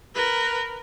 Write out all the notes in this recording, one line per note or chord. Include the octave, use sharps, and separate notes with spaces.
A#4 B4